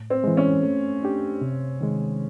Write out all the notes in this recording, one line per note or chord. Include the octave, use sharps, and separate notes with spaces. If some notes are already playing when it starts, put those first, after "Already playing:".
Already playing: A2
C4
E3 G#3
C#4
A3
D4 G4
C3
D#3 G#3